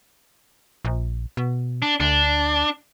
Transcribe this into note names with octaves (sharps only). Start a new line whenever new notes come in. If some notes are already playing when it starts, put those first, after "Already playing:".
A#1
B2
D4
D2 D4